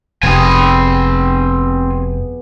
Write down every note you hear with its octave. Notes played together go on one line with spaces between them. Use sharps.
F1 B3 C4 G4 G#4 G#5